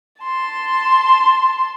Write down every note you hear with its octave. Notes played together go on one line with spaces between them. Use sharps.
A5 C6